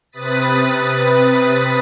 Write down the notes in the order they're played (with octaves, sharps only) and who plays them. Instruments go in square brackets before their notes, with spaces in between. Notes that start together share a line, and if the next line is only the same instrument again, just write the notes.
[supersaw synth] C3 B4 D#6 A6 B6